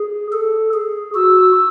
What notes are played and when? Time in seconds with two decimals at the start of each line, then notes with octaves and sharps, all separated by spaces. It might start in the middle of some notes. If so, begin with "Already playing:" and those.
Already playing: G#4
0.32 A4
0.74 G#4
1.14 F#4 E6